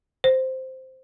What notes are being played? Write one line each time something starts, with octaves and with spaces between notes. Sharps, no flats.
C5